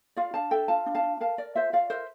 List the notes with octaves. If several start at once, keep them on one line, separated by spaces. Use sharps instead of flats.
F4 D5 F5
D4 F5 A5
A4 E5 G5
F4 F5 A5
D4
F5 A5
D4
A#4 F5 A5
A#4 D5
F4 C5 E5
F4 D5 F5
A#4 C5 E5